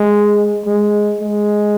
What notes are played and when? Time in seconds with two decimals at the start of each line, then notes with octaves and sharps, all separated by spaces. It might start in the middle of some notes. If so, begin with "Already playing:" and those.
Already playing: G#3
0.65 G#3
1.21 G#3